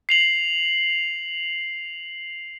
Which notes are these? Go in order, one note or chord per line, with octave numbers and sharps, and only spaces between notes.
C7 F7 F#7